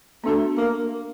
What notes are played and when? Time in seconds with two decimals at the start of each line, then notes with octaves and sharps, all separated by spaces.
0.24 A3 B3 D4 F#4 A4
0.57 A#3